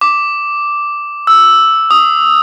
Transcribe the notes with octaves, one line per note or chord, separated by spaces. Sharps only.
D6
E6
D#6